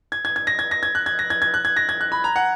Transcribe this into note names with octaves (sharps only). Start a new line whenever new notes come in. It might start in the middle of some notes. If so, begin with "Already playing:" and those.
G#6
G#6
G#6
A#6
G#6
A#6
G#6
F#6
G#6
A#6
G#6
G#6
F#6
G#6
A#6
G#6
F#6
B5
A#5
F#5